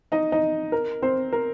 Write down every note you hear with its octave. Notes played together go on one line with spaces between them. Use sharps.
D#4 D#5
D#4 D#5
A#4
C4 C5
A#4